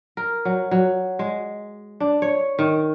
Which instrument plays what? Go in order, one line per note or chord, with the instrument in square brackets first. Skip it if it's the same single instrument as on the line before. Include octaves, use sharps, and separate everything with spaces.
[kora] A#4
F#3
F#3
G#3
D4
C#5
D#3